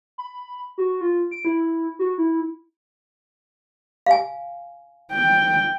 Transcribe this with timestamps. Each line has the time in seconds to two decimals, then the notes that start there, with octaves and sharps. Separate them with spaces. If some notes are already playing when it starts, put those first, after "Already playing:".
0.18 B5
0.78 F#4
1.01 F4
1.31 D7
1.45 E4
1.99 F#4
2.18 E4
4.06 F5 G#5
5.13 G5